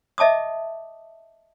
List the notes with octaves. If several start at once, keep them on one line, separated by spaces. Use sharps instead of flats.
D#5 E5 A5 D6 D#6